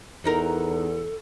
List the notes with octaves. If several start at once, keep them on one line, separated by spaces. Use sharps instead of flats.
E2 B3 D#4 A4 A#4